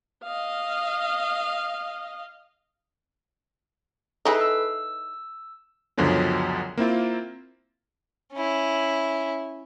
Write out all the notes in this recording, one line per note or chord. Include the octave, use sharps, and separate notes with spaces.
D#5 F5
D#4 E4 G#4 A4 B4
E6
C#2 F#2 D3 F3 F#3 B3
A#3 C4 E4 F4
C#4 E4